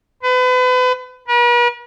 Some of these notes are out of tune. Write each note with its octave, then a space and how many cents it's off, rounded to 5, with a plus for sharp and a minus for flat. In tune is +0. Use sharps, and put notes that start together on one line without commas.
B4 +35
B4 -45